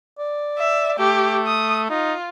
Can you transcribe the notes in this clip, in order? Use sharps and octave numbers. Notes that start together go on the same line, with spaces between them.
D5
E5
A3 G4
D#6
D#4 F4